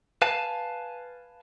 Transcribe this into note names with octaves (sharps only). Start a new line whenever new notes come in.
B4 F5 G#5 A5